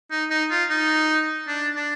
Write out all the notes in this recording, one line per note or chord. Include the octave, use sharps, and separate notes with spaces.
D#4
D#4
F4
D#4
D4
D4